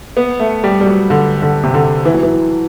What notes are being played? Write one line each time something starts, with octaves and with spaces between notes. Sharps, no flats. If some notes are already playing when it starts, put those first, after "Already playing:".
B3
A3
G3
G3
F#3
D3
D3
C3
D3
E3
F#3
E3